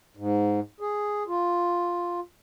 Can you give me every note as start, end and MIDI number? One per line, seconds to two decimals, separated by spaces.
0.17 0.60 44
0.80 1.23 68
1.27 2.20 65